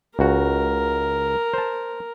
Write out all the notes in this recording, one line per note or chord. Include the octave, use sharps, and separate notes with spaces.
C#2 F#4 A#4
C5 A5